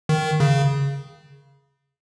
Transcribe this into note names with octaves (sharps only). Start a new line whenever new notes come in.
D#3
C#3